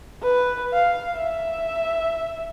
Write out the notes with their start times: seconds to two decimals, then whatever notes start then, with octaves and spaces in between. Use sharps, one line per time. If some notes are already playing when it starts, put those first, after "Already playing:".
0.22 B4
0.73 F5
1.17 E5